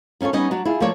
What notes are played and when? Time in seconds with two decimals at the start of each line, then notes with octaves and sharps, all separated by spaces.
0.21 D#2 C#4 F4 A4 C#5
0.33 G3 B3 C#4 D#4 D#5
0.51 F#3 D4 F#4
0.65 E4 F4 G#4
0.80 F3 A3 A#3 A4 C#5 D5